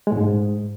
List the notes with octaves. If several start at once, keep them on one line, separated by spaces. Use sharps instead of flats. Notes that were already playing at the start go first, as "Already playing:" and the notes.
G#3
A2
G#2